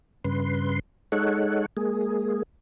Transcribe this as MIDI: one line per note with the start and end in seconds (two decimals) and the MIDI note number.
0.24 0.79 43
0.24 0.79 49
0.24 0.79 71
0.24 0.79 84
1.12 1.66 56
1.12 1.66 63
1.12 1.66 69
1.12 1.66 73
1.12 1.66 78
1.77 2.43 56
1.77 2.43 58
1.77 2.43 68